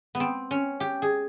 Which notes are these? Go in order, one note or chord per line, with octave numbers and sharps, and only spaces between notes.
B3
C4
C#4
G4
G#4